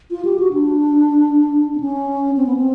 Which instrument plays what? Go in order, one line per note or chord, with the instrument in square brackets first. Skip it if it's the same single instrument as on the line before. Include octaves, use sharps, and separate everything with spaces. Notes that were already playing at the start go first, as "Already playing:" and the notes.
[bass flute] F4
G4
F#4
D4
C4
C#4
C4
B3
C4